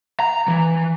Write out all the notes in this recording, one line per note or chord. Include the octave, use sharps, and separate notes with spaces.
A#5
E3